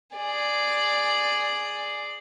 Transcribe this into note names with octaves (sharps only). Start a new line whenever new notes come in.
G#4 D5